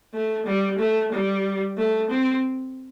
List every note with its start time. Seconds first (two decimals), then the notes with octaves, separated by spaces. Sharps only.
0.14 A3
0.46 G3
0.79 A3
1.12 G3
1.77 A3
2.10 C4